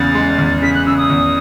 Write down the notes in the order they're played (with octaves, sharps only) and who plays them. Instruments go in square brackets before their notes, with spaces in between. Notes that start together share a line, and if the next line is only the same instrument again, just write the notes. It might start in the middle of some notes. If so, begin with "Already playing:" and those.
Already playing: [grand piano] E2 C#3 [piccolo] A6
[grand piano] G#3
E2
[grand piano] C#3 [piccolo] B6
[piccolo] F#6
[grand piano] C#3 [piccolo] E6
[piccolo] D#6
[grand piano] E2